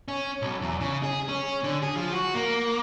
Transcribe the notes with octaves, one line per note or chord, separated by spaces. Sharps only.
C#4
B1
E2
C#3
G#4
C#4
D3
G#4
F3
F#4
A#3